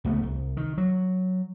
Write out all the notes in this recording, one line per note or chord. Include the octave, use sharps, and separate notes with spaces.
C#2 A3 B3
C2
D#3
F#3